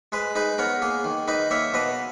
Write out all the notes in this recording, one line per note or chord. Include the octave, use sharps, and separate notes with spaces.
G#3 G#4 B4
D#4 G#4 B4
B3 A#4 C#5
A#3 G#4
D#3
D#4 B4 D#5
A#3 C#5 E5
B2 B4 D#5